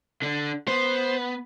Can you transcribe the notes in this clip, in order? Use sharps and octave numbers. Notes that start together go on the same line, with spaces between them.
D3 D4
B3 C5